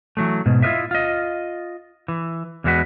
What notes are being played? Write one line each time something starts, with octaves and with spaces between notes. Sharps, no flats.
E3 F#3 A3
G#2 B2
E4 F4 A#4 B4 D#5 E5
F4 D#5
E3
E2 E3 G#3 A3 F#4 B4